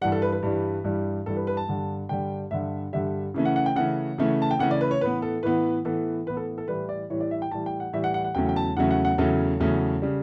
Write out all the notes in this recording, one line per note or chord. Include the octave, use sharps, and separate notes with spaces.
G2 E3 G3 F#5
A4
B4
B4
G2 E3 G3
G2 E3 G3
G2 E3 G3 A4
B4
B4
A5
G2 D3 G3
G2 D3 G3 G5
G2 D3 G3 E5
G2 D3 G3 E5
C#3 E3 A3 C#4
F#5
F#5
G5
C#3 E3 A3 C#4 F#5
C#3 E3 A3 C#4
A5
G5
C#3 E3 A3 C#4 F#5
D5
B4
C#5
A2 E3 B3 B4
A4
A2 E3 B3 B4
A2 E3 B3 A4
A2 E3 B3 B4
A4
A4
A2 E3 G3 B4
D5
A2 E3 G3 C#5
D5
E5
G5
A2 E3 G3 A5
G5
F#5
A2 E3 G3 E5
F#5
F#5
F#5
E2 C#3 F#3 A3 C#4 G5
G5
A5
E2 C#3 F#3 A3 C#4 F#5
F#5
F#5
E2 C#3 F#3 A3 C#4 A4
E2 C#3 F#3 A3 C#4
C#3 G3